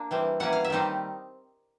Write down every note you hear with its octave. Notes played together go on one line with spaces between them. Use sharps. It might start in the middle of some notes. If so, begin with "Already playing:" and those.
Already playing: A#3 D4
E3 G3 C4
E3 G3 A#3 C#4 F#5
F5
E5
D#3 G3 C4 D#4